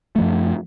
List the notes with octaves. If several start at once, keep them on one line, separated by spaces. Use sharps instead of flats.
F#2 F3 A3